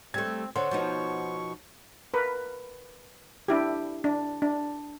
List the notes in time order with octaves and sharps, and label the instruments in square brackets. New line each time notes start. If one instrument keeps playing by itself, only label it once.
[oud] G3 A3 [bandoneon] C4 [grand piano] G#6
[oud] D3 [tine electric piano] C5 F#5 C6 [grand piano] C#5
[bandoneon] B2 C#6 [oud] F3 B3 D#4
[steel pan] A#4 B4
D4 E4 G4
D4
D4